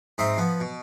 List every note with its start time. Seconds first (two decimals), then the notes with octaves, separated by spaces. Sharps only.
0.18 G#2 C4 D#5 E5 A#5 C6
0.37 F3 B3
0.60 B2